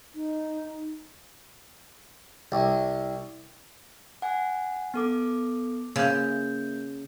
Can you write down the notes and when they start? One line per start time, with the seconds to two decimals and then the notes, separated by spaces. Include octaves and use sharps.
0.15 D#4
2.52 C2
4.22 F#5 G#5
4.94 B3 A4 D6
5.96 C#3 A#3 G6